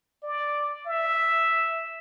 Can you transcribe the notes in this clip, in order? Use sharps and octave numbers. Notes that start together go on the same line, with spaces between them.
D5
E5